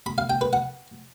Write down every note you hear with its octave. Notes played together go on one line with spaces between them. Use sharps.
B5
F5
G5
B4
F#5